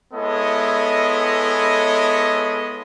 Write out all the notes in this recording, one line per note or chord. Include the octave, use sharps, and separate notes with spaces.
G#3 B3 E4 A4 C#5 D#5